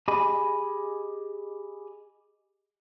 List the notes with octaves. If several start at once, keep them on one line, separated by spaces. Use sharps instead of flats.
G4 G#4 D#5 G#5 B5